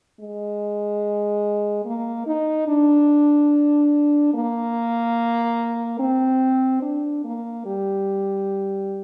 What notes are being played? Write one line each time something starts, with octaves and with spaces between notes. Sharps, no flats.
G#3
A#3
D#4
D4
A#3
C4
D4
A#3
G3